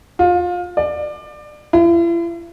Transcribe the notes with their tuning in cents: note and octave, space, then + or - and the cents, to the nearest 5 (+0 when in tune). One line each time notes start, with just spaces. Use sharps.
F4 +25
D5 +25
E4 +45